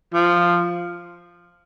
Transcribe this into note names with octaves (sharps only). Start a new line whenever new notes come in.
F3